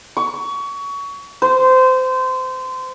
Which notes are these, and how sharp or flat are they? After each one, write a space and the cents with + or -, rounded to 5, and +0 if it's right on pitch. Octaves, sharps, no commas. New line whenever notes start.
C#6 +25
C5 -25